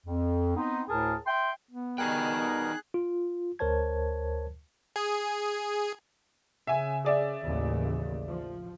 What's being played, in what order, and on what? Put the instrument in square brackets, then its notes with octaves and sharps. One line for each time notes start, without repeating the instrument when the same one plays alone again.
[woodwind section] F2
B3 C4 D#4
D2 A2 G#4 A#4 A5
E5 G5 C6
[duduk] B3
[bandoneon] B2 G3 A#4 [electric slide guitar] D#4 D#5 G5 [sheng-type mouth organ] G#4 F#6
[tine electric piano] F4
D2 A#4 C5 C#5 A5 G#6
[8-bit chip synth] G#4
[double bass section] C#3 [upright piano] E5 G#5
[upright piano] G#4 D5 E5
[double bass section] A1 D#2 C#3
F3